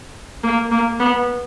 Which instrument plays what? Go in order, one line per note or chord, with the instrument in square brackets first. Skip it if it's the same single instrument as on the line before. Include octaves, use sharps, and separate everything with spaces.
[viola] A#3
A#3
B3